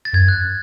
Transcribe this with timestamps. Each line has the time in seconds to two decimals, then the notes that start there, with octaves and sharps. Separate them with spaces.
0.05 A6
0.13 F#2 G#6
0.28 F#6
0.33 G#6